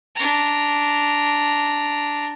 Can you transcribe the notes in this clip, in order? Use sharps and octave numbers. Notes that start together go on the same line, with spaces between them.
D4 A#5